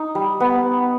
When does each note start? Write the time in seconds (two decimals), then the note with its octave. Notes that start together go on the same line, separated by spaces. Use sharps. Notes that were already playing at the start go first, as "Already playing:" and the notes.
Already playing: D#4
0.15 G3
0.40 B3